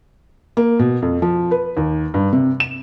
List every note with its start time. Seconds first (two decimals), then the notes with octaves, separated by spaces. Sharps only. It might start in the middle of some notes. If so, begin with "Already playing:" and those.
0.57 A#3
0.79 B2
1.02 F2
1.22 F3
1.51 B4
1.77 D#2
2.14 G2
2.33 C3
2.60 E7